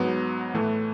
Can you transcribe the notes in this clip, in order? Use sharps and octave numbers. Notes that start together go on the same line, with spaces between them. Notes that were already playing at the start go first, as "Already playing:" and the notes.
Already playing: G#2 F#3 B3
A2 E3 A3